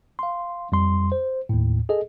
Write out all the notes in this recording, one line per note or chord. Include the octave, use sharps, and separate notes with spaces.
F5 C6
F2 G3 C6
C5
D#2 A2
G#4 A4 D#5